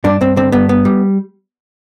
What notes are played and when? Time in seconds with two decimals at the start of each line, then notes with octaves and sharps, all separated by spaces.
0.04 G2 D4
0.21 G2 C4
0.37 D3 C4
0.52 G2 B3
0.69 B3
0.85 G3